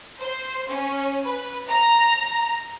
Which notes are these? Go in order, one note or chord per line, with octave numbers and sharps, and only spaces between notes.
C5
C#4
B4
A#5